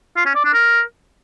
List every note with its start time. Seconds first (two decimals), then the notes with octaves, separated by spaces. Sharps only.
0.17 F4
0.26 C#4
0.35 D5
0.44 D4
0.54 A#4